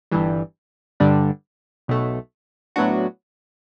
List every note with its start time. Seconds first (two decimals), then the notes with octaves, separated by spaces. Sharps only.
0.11 G1 G2 E3 G3
1.00 G2 D3 G3 D4
1.88 B1 B2 A3
2.76 A2 F#3 B3 D4 F#4